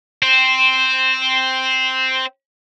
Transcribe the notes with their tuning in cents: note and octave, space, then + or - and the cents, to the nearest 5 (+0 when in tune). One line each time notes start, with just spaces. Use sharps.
C4 +0 C5 +0